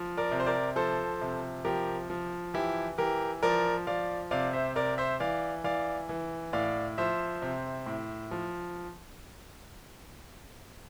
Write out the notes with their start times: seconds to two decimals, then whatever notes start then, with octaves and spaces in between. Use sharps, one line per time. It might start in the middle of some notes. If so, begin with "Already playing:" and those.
Already playing: F3
0.17 A#4 D5
0.31 C3
0.40 C5
0.46 A#4 D5
0.76 F3 A4 C5
1.21 C3
1.65 F3 G4 A#4
2.10 F3
2.54 E3 E4 G4
2.98 E3 G4 A#4
3.43 F3 A#4 D5
3.87 F3 D5 F5
4.31 C3 D5 F5
4.53 C5 E5
4.75 C3 A#4 D5
4.98 C5 E5
5.20 E3 D5 F5
5.64 E3 D5 F5
6.09 E3
6.53 A2 D5 F5
6.98 F3 C5 E5
7.42 C3
7.86 A2
8.31 F3